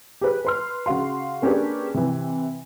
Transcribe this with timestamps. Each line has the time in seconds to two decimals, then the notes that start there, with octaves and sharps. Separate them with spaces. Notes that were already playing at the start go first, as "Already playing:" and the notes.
0.21 G4 G#4 B4
0.45 B4 C6 F6
0.86 C#3 F#4 F5 C6
1.42 A#3 C#4 D4 G4 G#4 B4
1.94 C3 E3